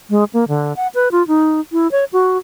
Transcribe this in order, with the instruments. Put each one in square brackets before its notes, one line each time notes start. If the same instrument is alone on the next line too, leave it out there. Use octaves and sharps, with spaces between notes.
[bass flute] G#3
A#3
D3
F#5
B4
F4
D#4
E4
C#5
F#4